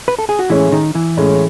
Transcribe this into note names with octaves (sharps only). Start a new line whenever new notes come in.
B4
A4
G#4
F#4
A2 E3 G#3 C#4 E4
D#3 D#4
E3 E4
A2 G#3 C#4